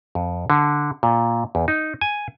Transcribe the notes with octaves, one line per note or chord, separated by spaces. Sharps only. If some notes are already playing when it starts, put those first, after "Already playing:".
F2
D3
A#2
E2
D#4
G#5